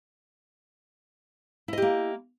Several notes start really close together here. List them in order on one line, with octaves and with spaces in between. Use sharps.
E4 D#5 G4 A#3